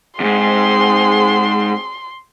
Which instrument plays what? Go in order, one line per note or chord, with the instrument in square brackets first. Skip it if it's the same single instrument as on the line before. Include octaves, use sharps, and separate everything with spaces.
[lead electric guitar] E2 G#2 [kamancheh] C4 G#4 [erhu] C6